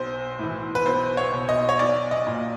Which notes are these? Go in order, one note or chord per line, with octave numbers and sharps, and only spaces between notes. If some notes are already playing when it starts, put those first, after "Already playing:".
Already playing: B1 C5
A2 E3
B4
B1 C5
C#5
B2
D#5
C#5
B1 D5
D#5
A#2